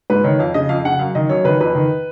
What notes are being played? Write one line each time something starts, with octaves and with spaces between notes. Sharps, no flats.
G#2 B4
D#3 C#5
F2 F5
C#3 D#5
F2 F5
C#3 F#5
F#2 F5
D#3 D#5
F#2 C#5
D#3 B4
F2 B4
D#3